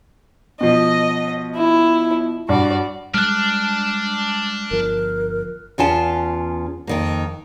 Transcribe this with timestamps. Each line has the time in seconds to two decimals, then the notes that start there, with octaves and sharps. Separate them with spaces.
0.61 B2 F3 D#5
1.55 E4
2.49 G2 F#4 D5
3.14 G3 G#3 D4 F6 F#6
4.71 G1 F3 A#4
5.78 E2 C#4 F4 A5
6.87 F2 D#3 A#3